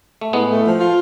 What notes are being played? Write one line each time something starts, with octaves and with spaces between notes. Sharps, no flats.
A3
A2 G#3 B3
A3
F3
F4